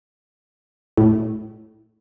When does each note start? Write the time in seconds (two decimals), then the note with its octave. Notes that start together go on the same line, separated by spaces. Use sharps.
0.97 A2